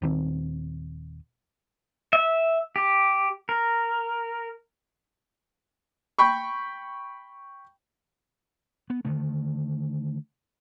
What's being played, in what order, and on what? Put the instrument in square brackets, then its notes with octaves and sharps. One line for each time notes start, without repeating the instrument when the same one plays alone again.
[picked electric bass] D#1 D#3 C4
[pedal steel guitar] E5
G4
A#4
[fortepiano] G5 B5 C#6
[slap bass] B3
D3 D#3 A3